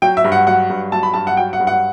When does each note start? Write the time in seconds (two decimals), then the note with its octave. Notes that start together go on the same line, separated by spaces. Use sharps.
0.02 F#3 G5
0.17 E5
0.24 G2
0.32 F#5
0.47 F#3 F#5
0.70 G2
0.92 F#3 A5
1.03 B5
1.14 G2 A5
1.27 F#5
1.37 F#3 G5
1.53 F#5
1.60 G2
1.67 F#5